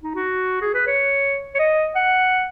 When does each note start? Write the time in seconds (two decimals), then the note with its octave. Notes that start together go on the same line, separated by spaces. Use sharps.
0.03 D#4
0.15 F#4
0.62 G#4
0.74 B4
0.87 C#5
1.55 C#5
1.59 D#5
1.96 F#5